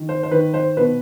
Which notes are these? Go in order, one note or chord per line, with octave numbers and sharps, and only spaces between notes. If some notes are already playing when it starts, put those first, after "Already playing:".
Already playing: D#3
C5
C5
D#3 B4
C5
B2 B4